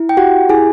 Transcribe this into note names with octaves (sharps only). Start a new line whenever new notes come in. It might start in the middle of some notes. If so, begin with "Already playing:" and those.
Already playing: E4
G5
F#4 G4 F#5
E4 G#4 G#5